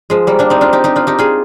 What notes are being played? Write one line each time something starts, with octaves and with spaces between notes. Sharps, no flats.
F3 G#3
G3 A#3
A#3 D4
C4 D#4
D4 F4
D#4 G4
D#4 G4
D4 F4
D#4 G4
F4 G#4